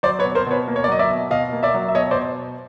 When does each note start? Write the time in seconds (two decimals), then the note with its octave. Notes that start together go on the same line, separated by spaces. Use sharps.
0.03 F#3 C5 D5
0.19 B4 C#5
0.24 B2
0.35 A#4 C5
0.46 B2 B4 C#5
0.68 A#3
0.76 C#5
0.84 D5
0.88 F#3 D#5
0.99 D5 E5
1.10 B2
1.31 B2 D#5 F5
1.52 A#3
1.63 D5 E5
1.74 F#3
1.88 E5
1.95 B2 C#5 D#5
2.11 C5 D5
2.16 B2